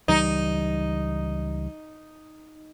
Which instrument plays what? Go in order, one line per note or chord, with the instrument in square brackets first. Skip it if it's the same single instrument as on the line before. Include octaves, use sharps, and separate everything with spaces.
[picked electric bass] C#2 E3 G3 [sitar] D#4